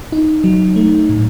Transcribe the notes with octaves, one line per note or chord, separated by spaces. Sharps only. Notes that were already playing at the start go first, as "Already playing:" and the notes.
D#4
F#3
A3
A2